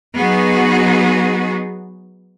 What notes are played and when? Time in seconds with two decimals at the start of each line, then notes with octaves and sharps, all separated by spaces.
0.17 F#3 B3 D#4 F#4 G#4